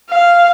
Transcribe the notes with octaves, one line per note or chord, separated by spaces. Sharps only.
F5